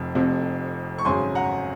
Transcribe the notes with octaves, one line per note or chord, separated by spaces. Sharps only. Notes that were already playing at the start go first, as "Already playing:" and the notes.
Already playing: F1 F2
F1 F2 C3
C#6
G#1 F#2 C#3 G#5 C6
F#5 A#5